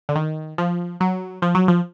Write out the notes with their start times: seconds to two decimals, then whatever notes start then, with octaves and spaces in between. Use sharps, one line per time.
0.09 D3
0.16 D#3
0.58 F3
1.00 F#3
1.42 F3
1.55 F#3
1.68 F3